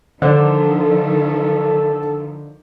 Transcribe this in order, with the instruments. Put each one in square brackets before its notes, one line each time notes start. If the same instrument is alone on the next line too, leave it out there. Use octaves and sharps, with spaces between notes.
[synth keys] D3 [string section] D#3 F3 [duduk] A4 [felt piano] C5 D5